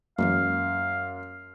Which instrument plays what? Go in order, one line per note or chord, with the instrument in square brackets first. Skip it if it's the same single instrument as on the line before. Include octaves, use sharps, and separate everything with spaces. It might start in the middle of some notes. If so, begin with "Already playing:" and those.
[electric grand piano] F#2 [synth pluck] E3 G#3 A#3 [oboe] F5